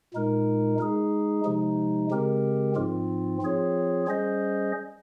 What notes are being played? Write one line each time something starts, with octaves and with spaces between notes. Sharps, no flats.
A#2 G#3 D#4 A#4
G#3 D#4 G#4
C3 F3 G#3 D#4
C#3 G#3 C4 G4 A#4
G#2 F3 C4 F4
F3 C4 F4 G#4 C#5
G3 C#4 G#4 C5 D#5